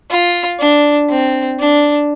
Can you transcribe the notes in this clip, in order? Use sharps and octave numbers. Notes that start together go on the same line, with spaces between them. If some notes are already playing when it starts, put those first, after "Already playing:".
F4
D4
C4
D4